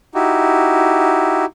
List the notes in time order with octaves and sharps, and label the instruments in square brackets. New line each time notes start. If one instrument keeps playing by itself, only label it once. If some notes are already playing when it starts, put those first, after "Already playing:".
[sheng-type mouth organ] D#4 E4 F#4 G4